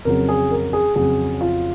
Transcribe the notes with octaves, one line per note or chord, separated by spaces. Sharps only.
F2 C#3 F#3 A#4
G#4
A#4
G#4
F2 C#3 F#3 G#4
F4